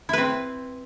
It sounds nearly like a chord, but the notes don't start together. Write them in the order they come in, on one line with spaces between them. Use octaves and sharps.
E4 B4 C4